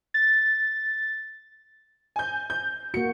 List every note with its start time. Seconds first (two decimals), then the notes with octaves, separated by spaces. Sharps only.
0.14 A6
2.16 G#5 G6
2.50 G6
2.94 A#3 F#4 C#7